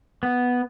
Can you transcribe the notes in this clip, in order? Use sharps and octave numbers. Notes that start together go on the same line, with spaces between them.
B3